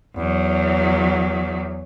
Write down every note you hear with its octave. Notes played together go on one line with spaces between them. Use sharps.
E2 F#3